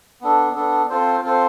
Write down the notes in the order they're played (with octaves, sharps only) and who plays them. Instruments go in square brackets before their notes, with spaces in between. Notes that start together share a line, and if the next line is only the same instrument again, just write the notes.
[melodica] B3 D4 A4
B3 D4 A4
C4 F4 A4 C5
C4 F4 A4 C5